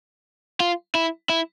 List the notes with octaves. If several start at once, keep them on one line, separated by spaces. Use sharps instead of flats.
F4
E4
E4